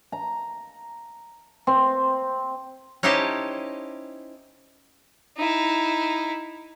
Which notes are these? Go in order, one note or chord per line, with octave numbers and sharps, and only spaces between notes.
A#5
C4
C#4 D#4 E4 G4 C5 A5
D#4 E4